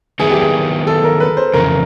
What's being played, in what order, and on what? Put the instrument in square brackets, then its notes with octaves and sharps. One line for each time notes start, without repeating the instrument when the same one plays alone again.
[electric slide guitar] D#3 F#3 B3 E4 [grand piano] G#4
[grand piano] G4
G#4
A4
A#4
B4
C5
[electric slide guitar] F2 C#3 E3 [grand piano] A#4